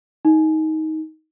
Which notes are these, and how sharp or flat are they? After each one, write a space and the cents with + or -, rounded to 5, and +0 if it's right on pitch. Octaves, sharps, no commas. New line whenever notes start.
D#4 +20